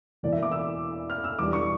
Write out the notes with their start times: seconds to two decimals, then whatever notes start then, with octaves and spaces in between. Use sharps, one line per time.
0.23 E1 E2 E3 A#3 D5
0.32 E5
0.43 D6
0.52 E6
1.10 F6
1.24 E6
1.39 E1 E2 E3 G3 D4 D6
1.53 C#6